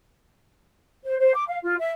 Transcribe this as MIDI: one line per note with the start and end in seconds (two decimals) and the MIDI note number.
1.04 1.16 72
1.18 1.31 72
1.33 1.44 86
1.47 1.57 77
1.62 1.75 65
1.78 1.90 76